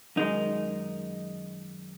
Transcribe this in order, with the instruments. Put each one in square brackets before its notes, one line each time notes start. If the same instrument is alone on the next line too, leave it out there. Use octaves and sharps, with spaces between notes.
[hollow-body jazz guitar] F#2 D#3 G#3 D#4